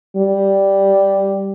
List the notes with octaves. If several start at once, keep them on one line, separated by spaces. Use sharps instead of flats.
G3